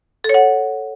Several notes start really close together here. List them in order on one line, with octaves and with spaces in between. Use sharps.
A4 C#5 F#5